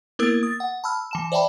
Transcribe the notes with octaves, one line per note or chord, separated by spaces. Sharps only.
A#3 B3 E4 A#4 E6
D#6 A6
F#5
A5 B5 E6 F6
E3 A5 E7
C5 D5 E5 G5 A5 B5